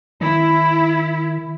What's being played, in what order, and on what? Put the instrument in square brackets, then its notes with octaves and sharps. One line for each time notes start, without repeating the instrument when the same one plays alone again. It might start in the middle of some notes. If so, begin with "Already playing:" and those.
[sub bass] D#3 [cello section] E4